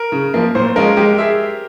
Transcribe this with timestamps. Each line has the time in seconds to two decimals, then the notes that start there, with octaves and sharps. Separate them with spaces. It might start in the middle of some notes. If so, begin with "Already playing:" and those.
Already playing: A#4
0.12 C#3
0.34 F3 A#3
0.55 A#2 C5
0.76 F3 G#3 C#4 F4 A#4
0.97 G#3 G4
1.18 G#4 E5